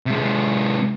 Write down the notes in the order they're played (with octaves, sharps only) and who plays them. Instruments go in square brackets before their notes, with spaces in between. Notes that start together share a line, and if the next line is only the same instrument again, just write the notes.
[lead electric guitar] C3 G#3